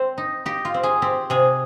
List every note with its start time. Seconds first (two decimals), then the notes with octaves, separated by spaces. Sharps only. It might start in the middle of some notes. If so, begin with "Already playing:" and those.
Already playing: C4 C5
0.18 D#4
0.45 D#4 G4
0.65 F4
0.74 C4
0.83 G#4
1.02 C4 G4
1.30 C3 G#4